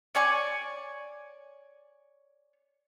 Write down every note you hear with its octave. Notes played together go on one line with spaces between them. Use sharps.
C#5 D5 G#5 C#6